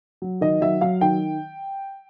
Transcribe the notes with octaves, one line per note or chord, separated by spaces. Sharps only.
F#3
D#3 D#5
F#3 E5
F#3 F5
D#3 G5